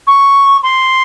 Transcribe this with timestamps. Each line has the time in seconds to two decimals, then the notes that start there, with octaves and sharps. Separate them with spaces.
0.07 C#6
0.63 C6